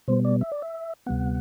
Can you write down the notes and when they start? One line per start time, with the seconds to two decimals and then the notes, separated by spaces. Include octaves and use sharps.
0.08 B2 G3 B3 C5
0.25 D5
0.41 E5
0.52 D5
0.62 E5
1.06 D2 C3 G3 B3 F#5